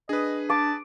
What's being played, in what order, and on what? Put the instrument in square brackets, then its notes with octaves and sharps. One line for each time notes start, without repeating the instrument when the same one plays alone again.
[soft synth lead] D4 [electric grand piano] G#4 B4 [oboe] D#5
[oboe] A5 [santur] D6